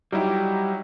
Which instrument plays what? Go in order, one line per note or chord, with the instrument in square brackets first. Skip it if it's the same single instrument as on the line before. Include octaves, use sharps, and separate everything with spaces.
[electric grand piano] F#3 D#4 E4 [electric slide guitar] G3 G4